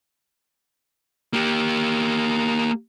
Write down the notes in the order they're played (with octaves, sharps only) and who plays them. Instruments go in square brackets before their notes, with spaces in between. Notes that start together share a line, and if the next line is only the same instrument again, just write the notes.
[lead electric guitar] A#3 G4